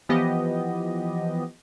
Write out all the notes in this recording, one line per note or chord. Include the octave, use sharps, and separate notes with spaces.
E3 F3 B3 G4 D#5